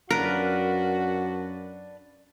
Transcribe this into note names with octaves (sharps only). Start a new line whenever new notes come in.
F#2 D4 F#4 A#4 B4 F5